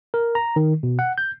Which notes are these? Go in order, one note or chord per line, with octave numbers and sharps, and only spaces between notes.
A#4
A#5
D#3
B2
F#5
G6